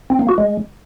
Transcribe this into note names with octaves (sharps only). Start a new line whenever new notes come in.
C4
A#3
F#4
G#3